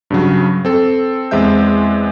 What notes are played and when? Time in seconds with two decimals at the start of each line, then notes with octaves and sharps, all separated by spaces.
0.10 G2 C#3 F#3
0.65 C4 A4
1.31 E2 G#3 C4 E5 G6